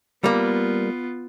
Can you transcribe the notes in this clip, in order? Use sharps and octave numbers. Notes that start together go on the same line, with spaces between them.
G3 A#3 B3 F4